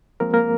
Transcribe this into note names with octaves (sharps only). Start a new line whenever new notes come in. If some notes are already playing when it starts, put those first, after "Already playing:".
F3 G#3 A#3 C4 A#4
A#3 A#4